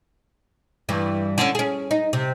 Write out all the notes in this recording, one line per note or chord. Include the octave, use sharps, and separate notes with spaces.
G2 E3
D3 C#4
C#4 G#4
D#4
C3